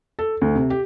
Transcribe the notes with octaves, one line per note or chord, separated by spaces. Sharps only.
A4
D2
C3
G4